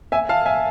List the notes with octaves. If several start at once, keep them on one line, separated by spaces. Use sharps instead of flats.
E5 G#5
F5 A5
E5 G#5